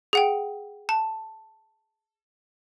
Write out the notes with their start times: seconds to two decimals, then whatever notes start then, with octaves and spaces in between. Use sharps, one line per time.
0.13 G#4 F#5 G5
0.89 A5